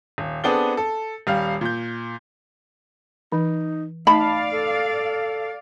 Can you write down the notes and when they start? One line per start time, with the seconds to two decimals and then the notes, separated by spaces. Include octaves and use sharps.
0.18 D#1
0.44 B3 C4 D4 G#4 A4 G7
0.77 A4
1.27 D#1 G3 F5
1.61 A#2 G6
3.32 E3 D#4
4.07 A3 D#4 D5 F5 A5 B5
4.53 A4